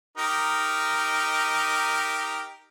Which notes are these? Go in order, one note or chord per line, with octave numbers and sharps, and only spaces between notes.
D#4 G4 A#4